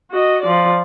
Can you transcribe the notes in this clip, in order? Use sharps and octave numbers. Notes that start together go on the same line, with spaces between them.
F#4 D#5
F3 D5